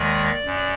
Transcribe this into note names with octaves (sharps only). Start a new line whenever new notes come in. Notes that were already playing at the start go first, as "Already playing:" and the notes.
Already playing: D#2 D#3 G#3 D5
F#2